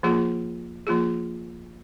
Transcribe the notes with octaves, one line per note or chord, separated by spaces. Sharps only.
F3 A#3 F4 G#4
F3 A#3 F4 G#4